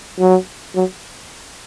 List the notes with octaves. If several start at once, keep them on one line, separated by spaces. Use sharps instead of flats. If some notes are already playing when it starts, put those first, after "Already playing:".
F#3
F#3